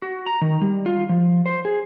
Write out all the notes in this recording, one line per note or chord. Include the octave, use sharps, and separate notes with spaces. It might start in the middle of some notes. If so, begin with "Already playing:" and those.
F#4
A#5
D#3
G3
F4
F3
C5
G#4